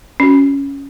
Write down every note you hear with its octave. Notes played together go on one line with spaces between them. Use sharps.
C#4 F#4